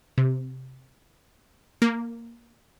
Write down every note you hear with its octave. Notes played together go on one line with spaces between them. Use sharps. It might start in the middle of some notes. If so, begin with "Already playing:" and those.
C3
A#3